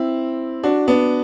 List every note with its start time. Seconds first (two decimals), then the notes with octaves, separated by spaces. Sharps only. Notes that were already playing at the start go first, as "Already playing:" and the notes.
Already playing: C4 E4
0.63 D4 F#4
0.88 B3 D4